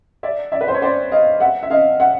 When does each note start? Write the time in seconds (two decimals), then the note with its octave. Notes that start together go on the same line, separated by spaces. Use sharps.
0.23 D5 E5
0.52 D5 E5
0.61 B4
0.68 C5
0.74 C#5
0.82 C5 D5
1.12 D#5 F5
1.40 E5 F#5
1.63 E5
1.70 D#5 F5
2.00 E5 F#5